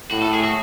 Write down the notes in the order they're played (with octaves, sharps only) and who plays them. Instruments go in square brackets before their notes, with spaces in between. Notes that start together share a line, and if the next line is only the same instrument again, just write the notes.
[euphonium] A2 [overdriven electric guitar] F#4
[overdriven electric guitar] A4
G#4
F#4